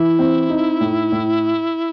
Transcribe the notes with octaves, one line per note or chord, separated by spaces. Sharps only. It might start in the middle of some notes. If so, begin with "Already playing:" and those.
Already playing: E3 E4
C4
D#4
A2
A2